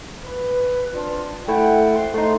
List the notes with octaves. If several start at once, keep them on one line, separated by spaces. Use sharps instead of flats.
B4
C4 D4 F4
A3 E4 E5 F#5 G5
F2 C6
A3 D#4